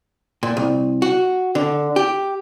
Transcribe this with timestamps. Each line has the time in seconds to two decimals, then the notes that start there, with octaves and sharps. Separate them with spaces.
0.43 A#2
0.57 C2
1.02 F#4
1.55 D3
1.96 G4